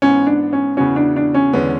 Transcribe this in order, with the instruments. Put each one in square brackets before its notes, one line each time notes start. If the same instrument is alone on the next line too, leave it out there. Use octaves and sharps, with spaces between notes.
[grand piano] G#2 E3 B3 [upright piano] C#4
[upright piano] D4
C#4
[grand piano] E2 C#3 E3 B3 F#4 [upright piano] C#4
[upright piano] D4
D4
C#4
[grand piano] E2 D3 G#3 C#4 [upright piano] B3